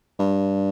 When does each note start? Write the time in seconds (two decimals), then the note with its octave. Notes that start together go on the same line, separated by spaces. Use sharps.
0.19 G2